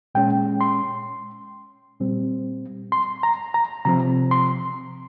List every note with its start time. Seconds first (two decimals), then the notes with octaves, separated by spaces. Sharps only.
0.15 A#2 G#3 C#4 G5
0.61 C6
2.00 A#2 G3 C4
2.92 C6
3.23 A#5
3.54 A#5
3.85 C3 F3 C4 A#5
4.31 C6